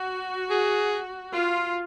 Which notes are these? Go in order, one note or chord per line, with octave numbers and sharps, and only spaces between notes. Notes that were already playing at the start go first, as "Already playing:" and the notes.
Already playing: F#4
G#4
F4